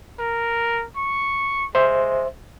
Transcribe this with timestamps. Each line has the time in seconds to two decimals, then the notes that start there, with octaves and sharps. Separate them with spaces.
0.19 A#4
0.97 C#6
1.75 G#3 C5 E5